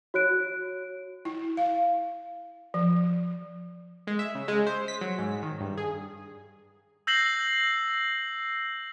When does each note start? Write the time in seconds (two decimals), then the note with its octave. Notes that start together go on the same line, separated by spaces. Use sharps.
0.14 F#4 C#5 F#6 D7
1.25 E4
1.57 F5
2.74 F3
4.07 G#3
4.19 E5
4.35 C#3
4.48 G#3
4.67 C5
4.88 B6
5.01 F#3
5.19 G#2
5.42 D#3
5.61 G2
5.78 G#4
7.07 E6 G6 A#6 C7 F#7